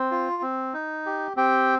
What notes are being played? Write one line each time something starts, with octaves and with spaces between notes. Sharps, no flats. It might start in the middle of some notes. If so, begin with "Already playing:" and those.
Already playing: C4
F4
C4
D#4
G4
C4 G4 G5